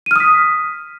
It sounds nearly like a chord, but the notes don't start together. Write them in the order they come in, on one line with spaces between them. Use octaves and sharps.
D#7 F6 D#6 B6